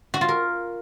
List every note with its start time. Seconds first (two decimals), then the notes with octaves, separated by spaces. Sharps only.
0.14 F#4
0.21 F4
0.29 A#4